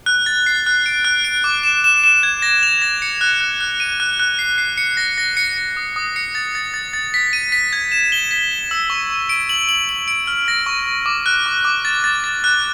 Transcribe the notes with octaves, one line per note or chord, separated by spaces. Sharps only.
F#6
A6
C7
F#6
D7
F#6
D7
D6
E7
E7
E7
G#6
A#6
F7
A#6
C#7
F#6
F#6
F#6
D#7
F#6
F#6
C7
C7
C#7
A#6
A#6
C#7
C#7
D#6
D#6
C#7
A6
A6
A6
A6
B6
D#7
B6
G#6
E7
G7
B6
G7
E6
C#6
C#6
D7
F#7
F#7
F#7
D7
F6
A#6
C#6
C#6
D6
F#6
D6
D6
A6
A6
A6
F#6